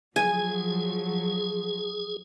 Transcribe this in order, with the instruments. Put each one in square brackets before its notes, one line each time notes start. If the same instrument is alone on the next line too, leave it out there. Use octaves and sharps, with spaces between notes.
[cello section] F3 F#3 [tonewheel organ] G#4 [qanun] G#5